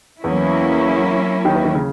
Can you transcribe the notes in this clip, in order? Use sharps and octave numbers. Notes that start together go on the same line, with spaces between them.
E2 E3 F#3 A#3 C#4 E4
D#2 D#3
E3
D#3
C#3